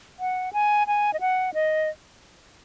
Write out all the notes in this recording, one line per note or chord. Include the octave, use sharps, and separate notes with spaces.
F#5
G#5
G#5
D#5
F#5
D#5